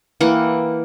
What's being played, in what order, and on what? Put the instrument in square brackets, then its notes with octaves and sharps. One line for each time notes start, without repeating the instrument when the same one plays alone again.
[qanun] E3 A#3 F#5 G5